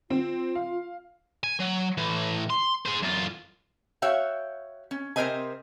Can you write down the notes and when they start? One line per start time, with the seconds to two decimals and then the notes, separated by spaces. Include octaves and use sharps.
0.10 C4 F4
0.55 F5
1.43 G#5
1.59 F#3
1.97 A2 E3
2.50 C6
2.86 G#4 C5
3.03 F#2 F4
4.02 F#4 C#5 E5 F5 G5
4.91 C#4
5.16 C3 C4 A#4 C5 D#5 G#5